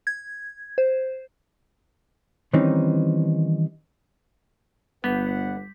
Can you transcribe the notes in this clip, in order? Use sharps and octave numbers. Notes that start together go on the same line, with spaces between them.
G#6
C5
D#3 E3 G3 C4 C#4 D#4
G1 G3 B3 B4 F#5 B6